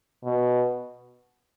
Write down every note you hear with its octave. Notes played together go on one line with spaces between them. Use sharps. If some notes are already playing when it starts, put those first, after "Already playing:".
B2